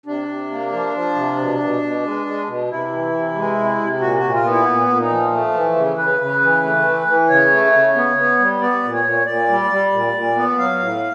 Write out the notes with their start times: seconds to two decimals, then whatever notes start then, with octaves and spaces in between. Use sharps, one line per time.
0.06 C3 D4
0.29 C3
0.51 A#3
0.72 F3
0.94 F3
1.16 C3
1.38 B2
1.60 B2
1.82 B2
2.03 G#3
2.26 G#3
2.47 B2
2.70 C3 E4
2.91 E3
3.13 C3
3.35 G#3
3.57 C3
3.79 C3
4.00 A#2 F#4
4.17 F#4
4.23 A#2
4.33 F4
4.44 B3
4.50 E4
4.67 A#2
4.88 A#2
5.00 D#4
5.10 F3
5.32 A3
5.54 E3
5.76 C#3
5.97 C#3 B4
6.20 C#3
6.41 E3
6.63 A3
6.85 E3
7.07 E3
7.30 C#3 C#5
7.51 A3
7.72 C#3
7.95 B3
8.17 B3
8.39 G3
8.61 B3 D5
8.83 A#2
8.94 C#5
9.05 A#2
9.26 A#2 D5
9.48 G3
9.71 G3
9.92 A#2
10.14 A#2
10.36 B3
10.57 F#3 F5
10.79 A2